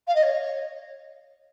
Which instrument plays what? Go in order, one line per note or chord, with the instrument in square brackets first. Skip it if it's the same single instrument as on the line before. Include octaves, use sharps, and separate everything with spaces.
[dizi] F5
D#5
C#5